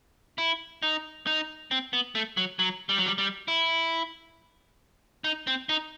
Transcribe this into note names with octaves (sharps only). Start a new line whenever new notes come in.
E4
D#4
D#4
C4
B3
A3
F#3
F#3
G3
F#3
G3
G3
E4
D#4
C4
D#4